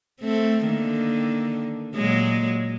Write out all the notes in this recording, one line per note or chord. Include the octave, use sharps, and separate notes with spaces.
A3 C4
D3 D#3 A#3
A#2 F#3 G#3